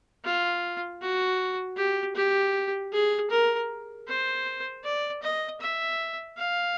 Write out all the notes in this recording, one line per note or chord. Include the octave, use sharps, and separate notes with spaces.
F4
F#4
G4
G4
G#4
A#4
C5
D5
D#5
E5
F5